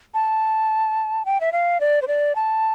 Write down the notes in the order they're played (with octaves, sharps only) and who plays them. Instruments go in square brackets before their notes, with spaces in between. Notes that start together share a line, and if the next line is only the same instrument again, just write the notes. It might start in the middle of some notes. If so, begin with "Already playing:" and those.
[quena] A5
G5
E5
F5
D5
C5
D5
A5